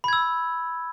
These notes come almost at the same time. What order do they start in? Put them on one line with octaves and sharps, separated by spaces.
B5 G#6 E6